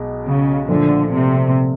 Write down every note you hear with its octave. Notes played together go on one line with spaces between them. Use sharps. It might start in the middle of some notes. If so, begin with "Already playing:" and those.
Already playing: B1 B2 G#3
C#3
A#2 D3 F3 A3
C3